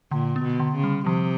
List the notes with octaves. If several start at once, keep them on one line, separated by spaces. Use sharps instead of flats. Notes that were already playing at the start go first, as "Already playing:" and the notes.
A#2 D3
B3
B2
D3
C#3
G3
C3 F3